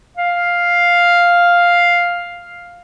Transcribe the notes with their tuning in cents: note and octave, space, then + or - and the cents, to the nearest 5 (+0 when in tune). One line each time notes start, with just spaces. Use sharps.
F5 +5